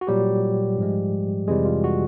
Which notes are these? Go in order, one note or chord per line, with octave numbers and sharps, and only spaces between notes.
F#4
A#2 F#3 G3 G4
G#2 F3 G#3
F2 C3 E3 G3 G#3 G#4
F4
F#4